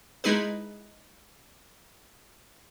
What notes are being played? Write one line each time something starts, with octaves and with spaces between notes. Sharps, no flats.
G#3 D#4 E4 G#4 B4